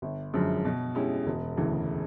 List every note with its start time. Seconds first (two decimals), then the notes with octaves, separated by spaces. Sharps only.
0.02 G1
0.33 F#2 D3 F3 G#3
0.65 B2
0.95 G#3 C#4 E4 G4
1.27 E1
1.57 D2 C#3 E3